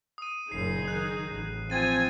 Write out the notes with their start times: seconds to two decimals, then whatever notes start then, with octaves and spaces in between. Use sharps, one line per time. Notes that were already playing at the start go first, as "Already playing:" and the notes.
0.18 D#6 D#7
0.52 F#1 A#2 D#4 G#4 C7
0.88 D#3 F#6
1.27 A1
1.70 F3 C4 G#5 G#6 A6 D#7